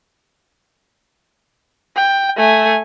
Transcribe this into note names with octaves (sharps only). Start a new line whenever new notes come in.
G5
A3 G#5